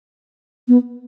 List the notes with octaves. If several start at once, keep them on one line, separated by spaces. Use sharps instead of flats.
B3